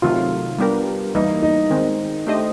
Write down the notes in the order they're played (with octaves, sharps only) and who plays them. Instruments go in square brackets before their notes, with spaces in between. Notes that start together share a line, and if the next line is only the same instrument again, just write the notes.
[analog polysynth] C3 D#3 F#3 A3 [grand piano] F4
[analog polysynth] G3 B3 D4 G4 A#4
[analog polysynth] E3 G3 A#3 [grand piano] D#4
[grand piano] D#4
[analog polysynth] D#3 G#3 C4
A3 D4 G4 C5 D#5